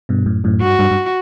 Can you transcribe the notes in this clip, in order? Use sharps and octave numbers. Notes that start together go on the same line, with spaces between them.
G2 B2
F#2 A2
F#2 A2
G2 F#4
G2
G2